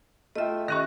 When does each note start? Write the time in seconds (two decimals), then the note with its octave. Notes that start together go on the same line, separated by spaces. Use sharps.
0.36 A3 F4 D#5 E5 G5
0.68 D#3 C#4 G4 C#6 F#6 A#6